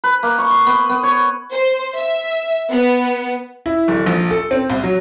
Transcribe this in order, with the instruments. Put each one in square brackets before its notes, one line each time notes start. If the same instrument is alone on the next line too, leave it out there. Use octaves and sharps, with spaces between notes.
[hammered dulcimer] B4
A#3
C#6
C6
B3
B3
C#5
[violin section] C5
E5
B3
[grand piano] E4
D1
A#1
A4
C4
C2
F#3